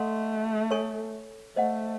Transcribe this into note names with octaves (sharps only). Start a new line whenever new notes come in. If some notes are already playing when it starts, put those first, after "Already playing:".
Already playing: A3 A4 D#5 F#5 C6
A4 C#5 G#5 C#6
A3 C5 D#5 F#5